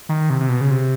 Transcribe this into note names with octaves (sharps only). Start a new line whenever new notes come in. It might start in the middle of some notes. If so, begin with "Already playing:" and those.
D#3
C3
C3
B2
C#3
C3